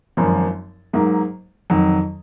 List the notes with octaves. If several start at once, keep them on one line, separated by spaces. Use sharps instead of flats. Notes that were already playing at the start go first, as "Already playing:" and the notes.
G#1 F#2 F3 A#3
G#2 F#3 A#3
F2 D#3 F#3